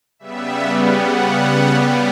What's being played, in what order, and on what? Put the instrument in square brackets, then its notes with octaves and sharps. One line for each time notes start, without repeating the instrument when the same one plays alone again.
[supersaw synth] C#3 G3 B3 E5
F#5